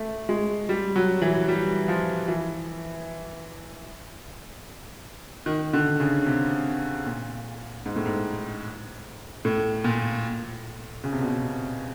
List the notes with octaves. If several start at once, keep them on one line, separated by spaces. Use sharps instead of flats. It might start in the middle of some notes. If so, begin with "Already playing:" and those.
Already playing: A3
G#3
G3
F#3
E3
G3
F3
E3
D#3
D3
C#3
C3
A#2
G#2
A2
G#2
A2
A#2
C#3
C3
B2
C3